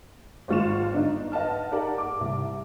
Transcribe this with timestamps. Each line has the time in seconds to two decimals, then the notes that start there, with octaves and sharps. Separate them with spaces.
0.48 G#1 G#3 F4 C#6 E7
0.92 G1 D4 D#4
1.32 B4 D#5 F#5 A5 F6
1.72 D#4 G4 A#4 D5 F#5 A5
1.98 D6
2.21 C2